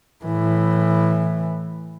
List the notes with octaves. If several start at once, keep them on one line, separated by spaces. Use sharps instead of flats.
A2 E3